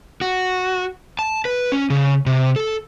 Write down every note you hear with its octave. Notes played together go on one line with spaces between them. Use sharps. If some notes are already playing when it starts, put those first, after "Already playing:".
F#4
A5
B4
C#4
C#3
C3
A4